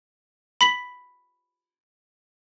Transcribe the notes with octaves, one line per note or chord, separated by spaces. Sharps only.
B5 B6 F#7